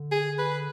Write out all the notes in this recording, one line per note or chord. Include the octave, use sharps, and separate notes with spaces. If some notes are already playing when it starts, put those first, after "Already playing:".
Already playing: D3
G#4
B4